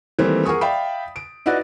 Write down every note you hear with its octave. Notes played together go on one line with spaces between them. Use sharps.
D#3 E3 G3 A3 A#3 C4
G#4 A#4 F#5 G#5 C#6 D#6
D5 E5 F5 G5 B5
D7
D#4 E4 F#4 B4 D5